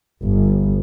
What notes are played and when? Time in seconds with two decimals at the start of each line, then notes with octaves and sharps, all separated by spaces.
0.25 G1